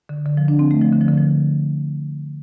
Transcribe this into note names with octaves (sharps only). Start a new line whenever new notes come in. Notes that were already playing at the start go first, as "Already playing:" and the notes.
D3
D3
F3
D4
C4
A3
F3
D3
F3
D3
F3